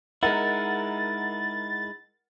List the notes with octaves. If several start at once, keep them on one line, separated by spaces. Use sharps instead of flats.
G#3 D#4 E4 A#4 F#5 A6